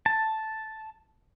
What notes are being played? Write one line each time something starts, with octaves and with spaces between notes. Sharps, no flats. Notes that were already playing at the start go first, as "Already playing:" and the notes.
A5